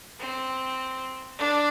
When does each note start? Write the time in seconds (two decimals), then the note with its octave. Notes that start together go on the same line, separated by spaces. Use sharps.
0.19 C4
1.38 D4